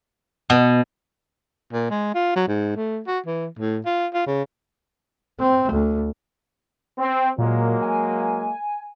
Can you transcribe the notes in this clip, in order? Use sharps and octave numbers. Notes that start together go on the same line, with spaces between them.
B2
A#2
G#3
F4
F#3
G#2
A3
F#4
E3
A2
F4
F4
C#3
C4
D2
C4
A#2 F#3 G#3 A#3
G#5